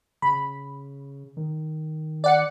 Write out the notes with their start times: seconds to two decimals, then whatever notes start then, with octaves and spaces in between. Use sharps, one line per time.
0.22 C#3 B5
1.37 D#3
2.24 D5 F#5 C#7